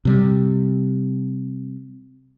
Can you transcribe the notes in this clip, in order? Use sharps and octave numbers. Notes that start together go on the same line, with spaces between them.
C3 G3